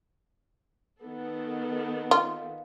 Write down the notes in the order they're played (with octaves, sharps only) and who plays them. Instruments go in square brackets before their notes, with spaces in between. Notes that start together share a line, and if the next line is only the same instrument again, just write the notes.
[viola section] D#3 B3 A4
[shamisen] F4